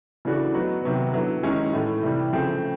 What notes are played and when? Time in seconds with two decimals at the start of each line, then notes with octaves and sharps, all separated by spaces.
0.25 C#3 E3 A3 D4 F#4
0.54 F#3 B3 D#4 F#4
0.84 C3 D#3 F#3 B3
1.13 D3 F#3 B3 E4
1.43 D#3 G#3 C#4 E4
1.73 A2 E3 A3
2.03 C3 E3 G3
2.33 C#3 F3 A3 C4